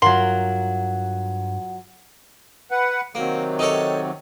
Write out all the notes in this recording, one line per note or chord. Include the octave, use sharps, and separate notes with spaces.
G2 F#3 F4 A#4 F#5 C6
B4 F#5
C3 D#3 F#3 A#3
D#4 A4 C#5